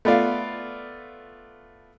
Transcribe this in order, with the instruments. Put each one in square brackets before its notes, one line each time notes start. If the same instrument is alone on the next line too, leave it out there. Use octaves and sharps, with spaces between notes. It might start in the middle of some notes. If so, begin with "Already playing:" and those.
[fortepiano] A3 B3 F4 D5 F5